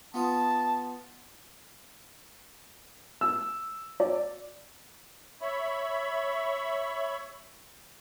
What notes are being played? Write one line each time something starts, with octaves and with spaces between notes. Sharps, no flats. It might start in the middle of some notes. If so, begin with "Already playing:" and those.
B3 F4 A5 D#6
E6
D5
C#5 E5 B5